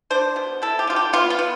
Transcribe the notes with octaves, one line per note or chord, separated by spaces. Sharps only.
D4 C5
B2
E4 A4
G4
D3 F4
G4
B3 F4
F4
B3